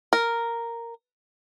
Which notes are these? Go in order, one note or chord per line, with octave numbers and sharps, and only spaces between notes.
A#4